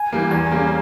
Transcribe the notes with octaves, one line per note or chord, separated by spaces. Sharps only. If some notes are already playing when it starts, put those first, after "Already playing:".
Already playing: G#5
E3 G3 A#3
E2 G#5
C#3 G3 A#3